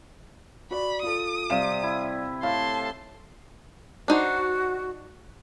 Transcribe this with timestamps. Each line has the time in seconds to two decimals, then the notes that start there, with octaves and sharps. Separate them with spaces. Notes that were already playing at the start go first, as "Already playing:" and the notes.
0.71 F#4 D5 B5
1.03 F4 A4 D#6
1.50 C3 G3 F5 E7
1.83 E4
2.43 A2 F5 A5 C6
4.08 D4 D#4 F#4 C5